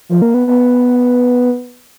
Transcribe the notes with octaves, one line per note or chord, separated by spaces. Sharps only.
F3
A#3
B3
B3